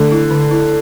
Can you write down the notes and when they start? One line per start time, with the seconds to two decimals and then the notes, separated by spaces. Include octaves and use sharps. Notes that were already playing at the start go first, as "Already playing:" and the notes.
Already playing: D3 A3
0.12 E4
0.31 D3
0.51 E4